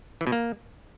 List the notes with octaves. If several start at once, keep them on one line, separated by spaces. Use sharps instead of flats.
E3
B2
A#3